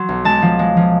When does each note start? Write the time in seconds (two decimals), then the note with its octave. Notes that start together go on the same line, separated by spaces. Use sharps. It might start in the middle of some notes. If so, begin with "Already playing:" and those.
Already playing: F#3 C6
0.09 B1
0.25 G#3 A5
0.42 F3
0.59 G#3
0.77 F3